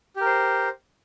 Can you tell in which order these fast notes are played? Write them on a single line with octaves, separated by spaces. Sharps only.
G4 A#4 C5